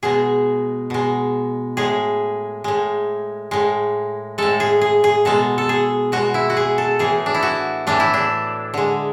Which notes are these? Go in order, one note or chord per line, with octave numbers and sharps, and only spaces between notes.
B2 G#3 G#4
B2 G#3
A2 G#3 G#4
A2 G#3
A2 G#3
A2 G#3 A4
G#4
G#4
G#4
B2 G#3 A4
A4
G#4
B2 G#3 F#4
E4
F#4
G#4
A4
A2 E3 A3 G#4
D4
E4
F#4
A2 E3 A3 D4
E4
D4
D3 G#3